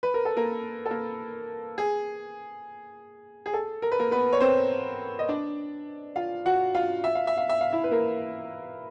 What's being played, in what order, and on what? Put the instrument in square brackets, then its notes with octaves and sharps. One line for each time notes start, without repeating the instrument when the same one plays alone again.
[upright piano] B4
A#4
A4
A#3 A#4
A4
A#3 A#4
G#4
G#4
A4
A#4
B4
A#3 A#4
B3 B4
C#5
C4 C5
D#5
D4 D5
F4 F5
F#4 F#5
F4 F5
E5
F5
E5
F5
E5
F5
E4 E5
B4
A#3 A#4